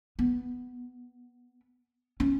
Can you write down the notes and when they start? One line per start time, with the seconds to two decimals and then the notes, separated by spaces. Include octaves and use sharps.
0.19 B3
2.20 C#4